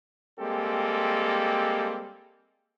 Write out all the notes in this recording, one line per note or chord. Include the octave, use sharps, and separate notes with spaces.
G3 G#3 A#3 C4 G4 A4